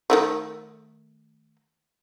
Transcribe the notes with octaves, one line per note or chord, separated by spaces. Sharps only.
D#3 F#3 A3